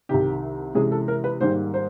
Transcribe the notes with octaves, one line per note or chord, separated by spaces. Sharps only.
C2 C3 D#3 G4
C3 E3 G#3 C#4 G#4
A4
A#4
B4
G#2 D#3 G3 A#3 D#4 C5
C5